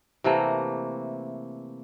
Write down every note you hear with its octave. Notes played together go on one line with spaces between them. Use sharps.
C3 E3 A3 A#3